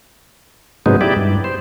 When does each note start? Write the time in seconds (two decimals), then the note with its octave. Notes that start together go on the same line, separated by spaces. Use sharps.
0.86 G#2 C3 F#3 G#3 B3 D#4
1.01 E4 G4 D5
1.16 G2
1.44 C5